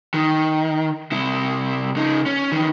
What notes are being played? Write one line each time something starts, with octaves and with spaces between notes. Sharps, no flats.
D#3
C3 E4
C#3 D#4
C#4
D#3 E3